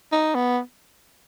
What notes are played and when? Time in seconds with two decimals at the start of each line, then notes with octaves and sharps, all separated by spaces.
0.12 D#4
0.35 B3